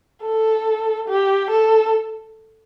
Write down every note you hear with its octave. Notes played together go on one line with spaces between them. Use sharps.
A4
G4
A4